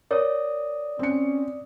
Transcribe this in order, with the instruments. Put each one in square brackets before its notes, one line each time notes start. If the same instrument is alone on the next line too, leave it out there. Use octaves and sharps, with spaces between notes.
[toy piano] A#4 C#5 [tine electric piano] D5 D#6
[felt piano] C4 C#7 [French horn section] C#4